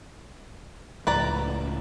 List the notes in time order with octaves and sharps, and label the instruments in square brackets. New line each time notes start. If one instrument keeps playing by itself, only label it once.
[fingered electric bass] C#2 A2 F3 [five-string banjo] B4 D5 A#5